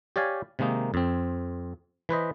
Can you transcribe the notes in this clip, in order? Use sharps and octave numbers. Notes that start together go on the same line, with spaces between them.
G4 C#5 D5 F5 G#5
C3 D#3 G#3 A#3 D#4
F2 C4
E3 B4 C5 D#5